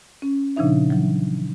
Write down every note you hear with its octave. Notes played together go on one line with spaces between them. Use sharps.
C#4
A#2 C#3 F3 D4 D#4 E5
E3 F#3